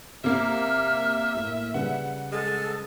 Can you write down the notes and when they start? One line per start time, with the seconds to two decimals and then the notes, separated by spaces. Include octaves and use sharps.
0.24 C3 A#3 E5 F6
1.33 A2 A#3
1.74 C#3 G3 B4 F#5
2.32 G#3 A4